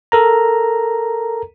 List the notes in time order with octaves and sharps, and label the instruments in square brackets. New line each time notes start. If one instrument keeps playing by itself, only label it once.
[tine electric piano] A4 A#4 A#5